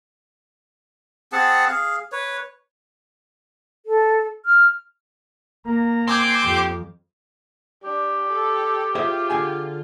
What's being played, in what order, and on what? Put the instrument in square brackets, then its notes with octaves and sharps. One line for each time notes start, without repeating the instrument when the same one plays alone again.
[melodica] C4 G#4 F#5 A5
G#4 F5
B4 C#5
[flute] A4
F6
[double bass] A#3 [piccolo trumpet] A#5
[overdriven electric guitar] C4 [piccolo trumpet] G#5 [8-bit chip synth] C6 D6 G6
[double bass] F2 [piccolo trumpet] G4
[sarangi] D4 [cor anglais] G4
[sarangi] A4
[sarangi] F4 [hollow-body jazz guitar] G#4 C5 E5
[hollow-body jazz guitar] D3 G#4 G#5